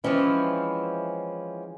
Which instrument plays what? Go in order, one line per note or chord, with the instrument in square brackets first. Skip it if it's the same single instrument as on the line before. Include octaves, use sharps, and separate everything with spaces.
[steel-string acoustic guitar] E3 F3 G#3 C4 C#4 E4